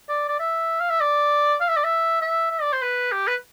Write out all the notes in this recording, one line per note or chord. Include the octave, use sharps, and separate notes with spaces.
D5
D5
E5
F5
E5
D5
F5
E5
D5
E5
E5
E5
D5
C5
B4
G4
B4